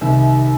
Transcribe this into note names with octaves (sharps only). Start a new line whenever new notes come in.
C2 C3 D#3 G3 E5